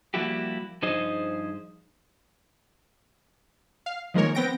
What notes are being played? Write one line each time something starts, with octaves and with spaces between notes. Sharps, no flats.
F3 G3 A#3 E4 F#4 G4
G2 F3 D#4 G#4 C5 D#5
F5
D#3 F3 G#3 A#3 A#4 C#5
B3 C4 G5 A#6 D7